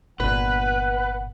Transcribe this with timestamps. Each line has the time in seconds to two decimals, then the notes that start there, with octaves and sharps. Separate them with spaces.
0.20 G1 A#2 B4 F#5